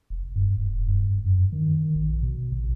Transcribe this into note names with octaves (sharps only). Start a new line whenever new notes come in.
F1
G2
E1
G2
F#2
D#3
D#3
A#1
B2
A#1